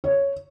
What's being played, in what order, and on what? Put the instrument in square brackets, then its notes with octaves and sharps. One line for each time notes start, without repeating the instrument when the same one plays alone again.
[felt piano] C#5